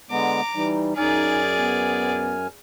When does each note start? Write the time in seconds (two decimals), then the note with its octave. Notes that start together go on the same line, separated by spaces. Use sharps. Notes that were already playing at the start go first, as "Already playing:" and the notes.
0.11 D3 G#3 B3 A#5 D6
0.55 E3 G3 D#4
0.97 F#2 D#4 G#4 D5 G#5 F6
1.57 B3